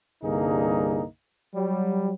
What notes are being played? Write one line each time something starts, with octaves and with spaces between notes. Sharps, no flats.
C2 G2 D3 A#3 D#4 G#4
F#3 G3